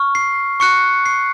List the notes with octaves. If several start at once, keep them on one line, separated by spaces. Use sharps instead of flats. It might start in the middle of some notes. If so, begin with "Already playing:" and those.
Already playing: C#6 F6
C7
C#6 F#6 C#7
C7